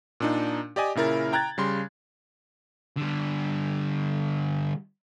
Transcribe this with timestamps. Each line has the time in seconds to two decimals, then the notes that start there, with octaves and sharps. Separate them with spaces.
0.20 A#2 D4 D#4
0.76 G4 D5 D#5 G#5
0.95 A#2 C#3 E4 A#4 A6
1.33 G5 A#5 F#6 G#6 A6
1.58 C#3 G3 C6
2.97 D3 G3